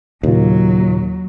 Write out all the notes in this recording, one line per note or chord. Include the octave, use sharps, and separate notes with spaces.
D#2 A#2 C#3 F#3 F4